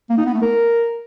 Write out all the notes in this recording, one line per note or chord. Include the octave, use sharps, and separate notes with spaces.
A#3
D#4
B3
A3
A#4